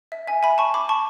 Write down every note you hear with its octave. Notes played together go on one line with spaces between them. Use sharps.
E5
E5 G#5
G#5 B5
A5 C#6
B5 D6
A5 C#6